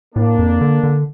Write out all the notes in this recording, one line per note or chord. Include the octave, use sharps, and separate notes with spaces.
A2 A#3 D4
F2
D3
D3